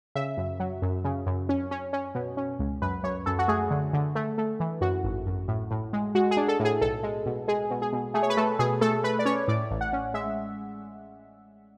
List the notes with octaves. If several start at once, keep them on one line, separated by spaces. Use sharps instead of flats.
C#3 E5
F#2
F#3
F#2
C#3
F#2
C#4
C#4
C#4
B2
C#4
C#2
F#2 B4
F#2 C#5
F#2 A4
F#4
A3 G#4
D3
D3
A3
A3
E3
F#2 F#4
G#1
F#2
A2
A2
G#3
G#3 F#4
G#4
D4
A4
A2 G#4
B1 A4
G#3
B2
G#3 G#4
B2
G#4
B2
A3 G#4
C#5
B4
A3 A4
B2 G#4
A3 A4
A3 B4
D5
C#4 C#5
A2 D5
A1
F#5
C#4
G#3 E5